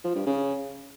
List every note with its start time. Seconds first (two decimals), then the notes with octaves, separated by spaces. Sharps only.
0.04 F3
0.15 G2
0.26 C#3